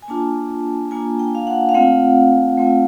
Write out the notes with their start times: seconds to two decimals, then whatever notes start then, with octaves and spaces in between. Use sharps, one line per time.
0.02 G#5
0.08 A#3 D4 F4 A5
0.91 A#3 D4 F4 G#5
1.19 G5
1.35 F5
1.47 F#5
1.69 F5
1.74 A3 C4 F4 F#5
2.58 A3 C4 F4